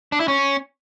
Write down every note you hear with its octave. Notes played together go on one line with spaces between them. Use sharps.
D4
E4
C#4